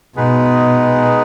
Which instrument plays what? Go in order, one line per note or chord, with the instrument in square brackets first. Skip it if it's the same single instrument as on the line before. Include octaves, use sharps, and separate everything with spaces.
[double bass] B2 [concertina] G#3 B3 D#4 G#4 B4